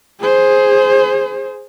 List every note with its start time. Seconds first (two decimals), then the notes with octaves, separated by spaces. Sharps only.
0.20 G#4 C5